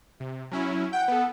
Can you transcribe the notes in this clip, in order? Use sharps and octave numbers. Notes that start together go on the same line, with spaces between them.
C3
F#3 C#4 E4
F#5 G5 G6
B3 A4